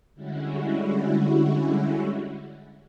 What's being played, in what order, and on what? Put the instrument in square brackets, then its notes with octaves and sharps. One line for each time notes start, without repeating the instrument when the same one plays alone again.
[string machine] D3 G3 G#3 C#4 E4 F#4